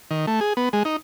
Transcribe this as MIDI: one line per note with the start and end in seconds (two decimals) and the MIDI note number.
0.11 0.26 51
0.27 0.40 57
0.41 0.53 68
0.57 0.69 59
0.73 0.83 56
0.85 0.96 63